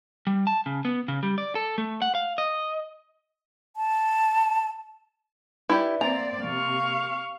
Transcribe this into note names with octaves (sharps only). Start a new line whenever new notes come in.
G3
A5
C#3
B3
C#3
G3
D5
A4
A3
F#5
F5
D#5
A5
E4 G4 B4 D5 E5
A#3 C4 D5 A#5
C3 F5 C#6